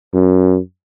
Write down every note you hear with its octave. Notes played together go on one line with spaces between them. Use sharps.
F#2